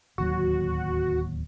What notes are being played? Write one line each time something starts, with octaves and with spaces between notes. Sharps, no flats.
D1 D#2 F#3 F#4